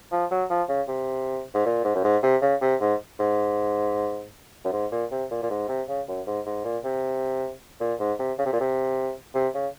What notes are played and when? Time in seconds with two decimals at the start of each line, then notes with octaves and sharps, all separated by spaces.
0.12 F3
0.31 F#3
0.50 F3
0.68 C#3
0.88 C3
1.54 G#2
1.66 A#2
1.84 G#2
1.95 F#2
2.04 G#2
2.23 C3
2.42 C#3
2.61 C3
2.80 G#2
3.19 G#2
4.65 F#2
4.72 G#2
4.92 A#2
5.11 C3
5.31 A#2
5.42 A#2
5.50 G#2
5.68 C3
5.88 C#3
6.08 F#2
6.27 G#2
6.46 G#2
6.65 A#2
6.84 C3
7.81 A#2
7.99 G#2
8.19 C3
8.38 C#3
8.45 C3
8.53 A#2
8.60 C3
9.35 C3
9.54 C#3